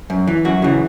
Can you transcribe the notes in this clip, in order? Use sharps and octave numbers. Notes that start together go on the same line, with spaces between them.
F#2
E3
F#2 F#4
C#3 E3